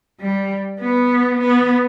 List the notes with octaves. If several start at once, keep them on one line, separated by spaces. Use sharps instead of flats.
G3
B3
B3